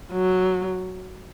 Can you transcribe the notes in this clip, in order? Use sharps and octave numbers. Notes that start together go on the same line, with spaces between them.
F#3